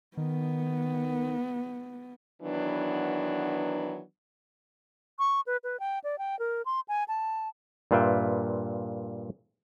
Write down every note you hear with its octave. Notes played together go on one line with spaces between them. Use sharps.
D#3 B3
D#3 E3 F#3 B3 D4
C#6
B4
B4
G5
D5
G5
A#4
C6
G#5
A5
G2 A#2 F4 B4 E5 G5